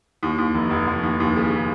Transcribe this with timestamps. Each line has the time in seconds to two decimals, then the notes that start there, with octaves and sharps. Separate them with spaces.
0.23 D#2
0.38 D#2
0.55 F1
0.70 F1
0.87 F1
1.03 D#2
1.20 D#2
1.36 C#3